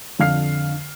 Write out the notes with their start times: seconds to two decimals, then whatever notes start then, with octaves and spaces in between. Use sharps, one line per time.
0.19 F2 D3 F5 F6 C7